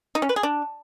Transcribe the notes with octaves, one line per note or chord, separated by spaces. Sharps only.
D#4
C#4
B4
G#4
D4